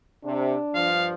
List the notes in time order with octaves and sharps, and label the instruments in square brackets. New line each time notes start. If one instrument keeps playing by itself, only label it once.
[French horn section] C3 [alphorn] D4
[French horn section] G2 F3 [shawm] F5